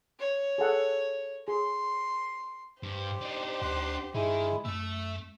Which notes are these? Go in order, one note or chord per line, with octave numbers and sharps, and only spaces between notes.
C#5
G#4 A4 F#5
G#4 C6
G2 G4 C5
D4 D#4
D2 F#5 C6
G2 D#3 G#3 E4
F#2 A3 E5 E6